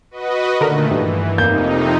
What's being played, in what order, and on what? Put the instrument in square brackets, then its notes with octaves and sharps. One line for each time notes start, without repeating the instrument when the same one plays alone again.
[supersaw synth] F#4 B4 D#5
[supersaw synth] A#2 D#3 A3 [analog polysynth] D3 A#4
[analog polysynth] G2 [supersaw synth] E3 [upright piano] B4
[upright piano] F1 A#3 G6 [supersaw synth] F2 C3 D#4